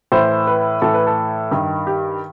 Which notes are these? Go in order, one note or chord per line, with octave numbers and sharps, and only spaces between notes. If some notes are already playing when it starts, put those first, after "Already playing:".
A2 E3 C5
B4
A2 E3 A4
B4
A4
G2 D#3
G4